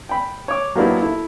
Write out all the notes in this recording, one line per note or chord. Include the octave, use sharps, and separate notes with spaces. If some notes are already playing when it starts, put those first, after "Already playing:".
G5 B5
C#5 D6
F#3 A#3 B3 D4 E4 G4
E4 A4